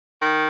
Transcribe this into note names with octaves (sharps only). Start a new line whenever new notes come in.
D#3